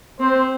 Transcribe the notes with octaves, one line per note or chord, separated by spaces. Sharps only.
C4 C5